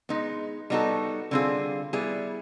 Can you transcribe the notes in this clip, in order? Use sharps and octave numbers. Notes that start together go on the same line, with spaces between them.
G#3 B3 D#4
G3 B3 D#4 F#4 A4
D3 G3 C4 F4 G#4
G3 B3 E4 G#4